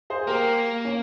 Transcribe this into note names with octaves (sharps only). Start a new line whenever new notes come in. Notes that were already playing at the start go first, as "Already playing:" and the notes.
G#4 C5
G#4
A#3 G4 A#4
C#4